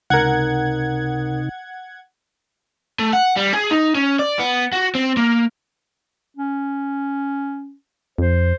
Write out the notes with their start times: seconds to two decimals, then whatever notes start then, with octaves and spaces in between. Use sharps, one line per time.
0.10 C#2 C3 D#4 A#4 F#5 G#6
2.99 A3
3.13 F#5
3.36 G3
3.54 G#4
3.71 D#4
3.95 C#4
4.19 D5
4.39 B3
4.73 F#4
4.95 C4
5.17 A#3
6.37 C#4
8.18 F2 C5